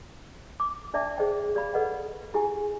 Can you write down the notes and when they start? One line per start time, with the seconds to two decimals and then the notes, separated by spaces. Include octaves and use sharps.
0.60 D6
0.94 D4 D5 E5 A5 D6
1.17 G#4 C5 D5 D#5 G5 A5
1.55 G4 D5 F5 B5
1.74 A4 B4 D#5 F#5
2.34 E4 G4 G#4 G#5